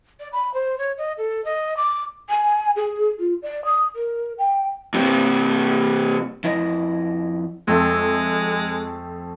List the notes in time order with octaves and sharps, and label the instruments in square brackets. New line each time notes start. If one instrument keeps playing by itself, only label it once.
[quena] D5
B5
C5
C#5
D#5
A4
D#5
D6
[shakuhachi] G#5
G#4
F4
D5
D#6
A#4
G5
[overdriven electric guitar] G2 C3
[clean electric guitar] F2 E4 B4 D#5
[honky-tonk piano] F2 [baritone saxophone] G#3 [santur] A3 C4